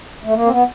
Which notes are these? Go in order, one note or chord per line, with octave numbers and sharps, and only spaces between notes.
A3
A#3
C4
B3